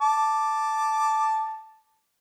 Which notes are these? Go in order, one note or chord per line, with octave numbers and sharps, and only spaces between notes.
A5 D6